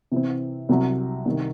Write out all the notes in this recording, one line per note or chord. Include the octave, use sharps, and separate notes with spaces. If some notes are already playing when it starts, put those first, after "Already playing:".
C3 E3 C4
C2 C3 F#3
C2 C3 D#3